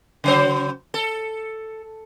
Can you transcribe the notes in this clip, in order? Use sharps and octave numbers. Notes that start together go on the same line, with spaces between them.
C#3 F#3 C5
A4